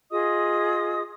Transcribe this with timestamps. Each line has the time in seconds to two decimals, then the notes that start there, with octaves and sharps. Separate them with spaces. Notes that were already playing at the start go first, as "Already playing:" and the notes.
0.11 F4 G#4 D#5 D#6